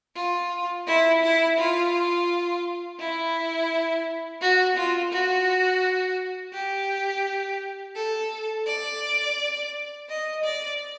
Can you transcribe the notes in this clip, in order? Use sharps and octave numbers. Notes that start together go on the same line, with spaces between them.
F4
E4
E4
F4
E4
F#4
F4
F#4
G4
A4
D5
D#5
D5